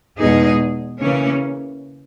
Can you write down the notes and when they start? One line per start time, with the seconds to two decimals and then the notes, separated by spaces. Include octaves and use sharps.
0.20 E2 B2 G#3 D#4 G#4
0.99 C#3 E3 A#3 C#4